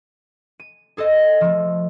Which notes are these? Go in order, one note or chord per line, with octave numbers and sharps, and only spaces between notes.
D#7
G#4 A4 C5 D#5
F3 A3